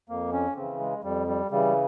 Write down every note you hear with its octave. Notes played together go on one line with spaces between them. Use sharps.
F2 A#3
C#4
C#3 E3 C4
G#3
F2 G3
G3
C#3 E3 G3